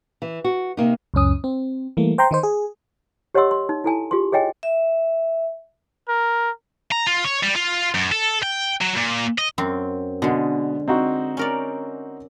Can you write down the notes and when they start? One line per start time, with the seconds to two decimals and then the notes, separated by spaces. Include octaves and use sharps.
0.22 E3
0.44 F#4
0.77 C3 A#3 D#4
1.14 C#2 F#2 C#4 D#6
1.44 C4
1.97 E3 G3 A3 A#3
2.18 C5 G5 A#5 C6
2.31 D#3 D#4 C5
2.43 G#4
3.35 G4 C#5 D#5 F#5 C6 E6
3.51 C6
3.69 D#4
3.84 E4 A4 G#5 A5
4.11 F4 G4 G#4 C6
4.32 G#4 C#5 D#5 G5 G#5
4.63 E5
6.08 A#4
6.92 A#5
7.07 F4
7.25 C#5
7.43 G3
7.56 F4
7.95 F#2
8.12 A4
8.43 G5
8.81 F#3
8.96 A#2
9.38 D#5
9.58 F#2 C4
10.22 B2 D3 G#3
10.88 C4 D#4 F#4
11.37 C#4 A#4 D5